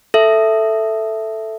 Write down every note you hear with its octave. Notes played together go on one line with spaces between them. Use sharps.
A4 E5